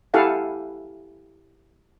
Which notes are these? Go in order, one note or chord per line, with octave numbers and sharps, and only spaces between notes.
E4 G4 A4 F5 F#5 G#5